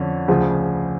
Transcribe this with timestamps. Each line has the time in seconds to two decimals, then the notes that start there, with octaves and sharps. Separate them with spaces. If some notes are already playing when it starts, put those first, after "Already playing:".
Already playing: F2 D3 C#4
0.28 D2 C#3 F3